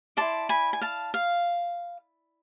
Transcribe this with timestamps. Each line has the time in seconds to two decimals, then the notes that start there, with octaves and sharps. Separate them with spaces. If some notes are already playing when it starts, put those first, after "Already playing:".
0.17 E4 B4 D5 A5 C6
0.49 G#5 B5
0.73 G#5
0.81 F5 A5
1.14 F5